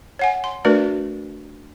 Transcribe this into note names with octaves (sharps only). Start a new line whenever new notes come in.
C#5 F#5 G#5
C6
A3 D4 F#4 A#4 B4 D5